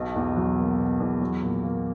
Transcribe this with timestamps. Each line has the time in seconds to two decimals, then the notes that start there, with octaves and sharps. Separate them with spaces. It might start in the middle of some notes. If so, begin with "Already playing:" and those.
Already playing: B1 B2
0.15 E2
0.36 F#3
0.57 A#3
0.78 B2
1.00 E2
1.21 F#3
1.42 A#2
1.64 A#3